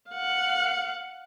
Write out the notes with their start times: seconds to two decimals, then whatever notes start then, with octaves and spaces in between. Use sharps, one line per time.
0.10 F5 F#5